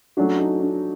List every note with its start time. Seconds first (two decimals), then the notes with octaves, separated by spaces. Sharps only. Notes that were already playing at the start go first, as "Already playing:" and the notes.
0.17 F#3 A3 C#4 D4 F#4
0.39 D#4
0.60 D4